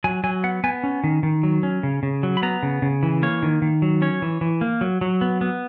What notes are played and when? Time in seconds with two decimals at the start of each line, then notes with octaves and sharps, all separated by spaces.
0.04 F#3 G#5
0.24 F#3 G#5
0.44 B3 F#5
0.64 B3 G#5
0.84 C#4
1.04 D#3
1.23 D#3
1.43 F#3
1.63 C#4
1.83 C#3
2.03 C#3
2.23 F#3
2.37 B5
2.43 B3 A#5
2.63 C#3
2.82 C#3
3.03 E3
3.23 A#3 C#5
3.43 D#3
3.62 D#3
3.82 F#3
4.02 C#4 C#5
4.22 E3
4.41 E3
4.61 A#3
4.81 F#3
5.01 F#3
5.21 B3
5.41 B3